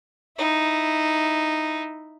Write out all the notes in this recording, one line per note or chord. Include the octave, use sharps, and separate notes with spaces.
D#4 E4